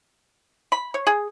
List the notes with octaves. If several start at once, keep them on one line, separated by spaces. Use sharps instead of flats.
B5
C#5
G#4